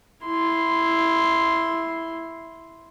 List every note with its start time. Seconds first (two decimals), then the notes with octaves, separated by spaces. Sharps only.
0.26 E4 C6